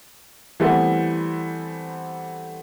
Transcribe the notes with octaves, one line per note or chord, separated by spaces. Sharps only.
E3 G3 A3 B3 C4 E4